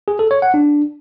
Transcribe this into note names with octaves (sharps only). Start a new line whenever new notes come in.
G#4
A4
C#5
F#5
D4